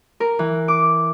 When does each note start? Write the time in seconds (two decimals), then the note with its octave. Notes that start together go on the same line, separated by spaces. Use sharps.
0.20 A#4
0.39 E3
0.68 D6